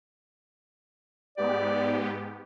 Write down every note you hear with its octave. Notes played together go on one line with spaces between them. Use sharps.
G#2 B3 G4 D5